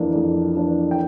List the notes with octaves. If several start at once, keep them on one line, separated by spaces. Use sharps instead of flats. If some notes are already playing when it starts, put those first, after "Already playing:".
Already playing: F2 E3 A#3 D4
F2
E3 A#3 D4
G5